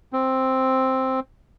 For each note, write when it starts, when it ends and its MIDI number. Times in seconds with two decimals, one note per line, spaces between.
0.13 1.20 60